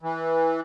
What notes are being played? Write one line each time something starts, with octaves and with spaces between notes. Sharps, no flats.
E3